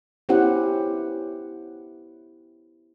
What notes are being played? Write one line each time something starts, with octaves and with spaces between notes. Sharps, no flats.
B3 C#4 E4 G4 C5 F#5